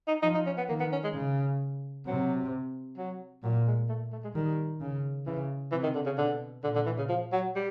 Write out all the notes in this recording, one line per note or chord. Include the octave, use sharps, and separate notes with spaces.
D#4
F3 D#4
D#4
C#4
B3
D#3 A#3
B3
C#4
G#3
C#3
C3 F#3
F#3
A#2 F#3
G#3
A3
A3
G#3
D#3 G3
C#3
C#3 E3
C3 E3
D#3
D3
C#3
B2 D3
A#2 D3
D3
E3
C#3
F3
F#3
G3